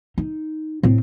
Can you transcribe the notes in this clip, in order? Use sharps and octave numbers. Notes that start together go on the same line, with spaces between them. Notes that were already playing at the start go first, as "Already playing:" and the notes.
D#4
A2 C4